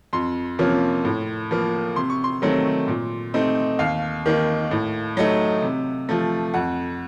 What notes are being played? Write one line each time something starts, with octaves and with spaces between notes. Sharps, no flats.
F2 C6
C3 F3 A#3 C#4
A2
F3 A#3
C3 C6
C#6
C6
D#3 F#3 A3 C4
A#2
A3 C4 D#4
D#2 F5
D#3 A#3 D#4
A2
F#3 A3 D#4
C3
F3 A3
F2 F#5